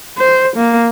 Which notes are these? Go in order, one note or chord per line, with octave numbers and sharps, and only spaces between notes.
C5
A#3